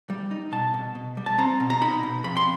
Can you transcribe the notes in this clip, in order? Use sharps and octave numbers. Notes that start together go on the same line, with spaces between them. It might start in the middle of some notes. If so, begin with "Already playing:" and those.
G3
D#4
B2 A5
B2
B2
G3
A5
C4 A#5
B2
A#5
D#4 B5
B2
F2 B5
C6